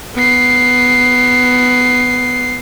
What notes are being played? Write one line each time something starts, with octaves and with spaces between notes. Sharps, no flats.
B3 C7